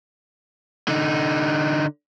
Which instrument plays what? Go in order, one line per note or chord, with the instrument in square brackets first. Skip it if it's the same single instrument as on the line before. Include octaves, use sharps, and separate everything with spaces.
[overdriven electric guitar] D3 D#4